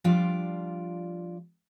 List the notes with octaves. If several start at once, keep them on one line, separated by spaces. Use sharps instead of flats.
F3 G3 D4 F4 D5